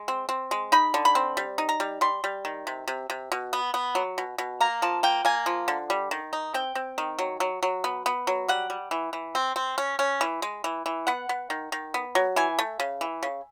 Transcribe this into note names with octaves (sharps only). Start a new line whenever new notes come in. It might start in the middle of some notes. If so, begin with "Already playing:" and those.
Already playing: G#3
C4
C4
G#3
D#4 B5
D3
B5
C4
G3
D#4
A#5
G3
G3 C6
G3
D#3
C3
C3
C3
B2
B3
B3
F#3
B2
B2
A#3 A#5
F3 A5
A#3 G5
A#3 G#5
F3
D3
G3
D#3
D#4
C4 G5
C4
D#3
F#3
F#3
F#3
B3
B3
F#3
G3 F#5
G3
E3
E3
C4
C4
C#4
C#4
E3
G#3
E3
E3
B3 F#5
B3
D#3
D#3
B3
F#3
E3 G#5
A3
C#3
E3
C#3